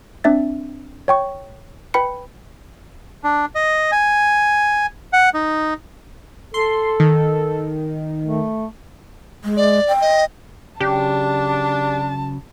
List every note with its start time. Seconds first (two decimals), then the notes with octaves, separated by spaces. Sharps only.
0.24 C4 D4 E5 A6
1.08 C#5 G5 C#6
1.94 B4 G5 B5 C#7
3.24 D4
3.55 D#5
3.92 G#5
5.13 F#5
5.34 D#4
6.54 A4 C6
7.00 D#3
8.25 A3
9.44 G#3
9.57 D5
9.88 G5
10.01 D#5
10.80 C#3 F#3 D4 G4 A5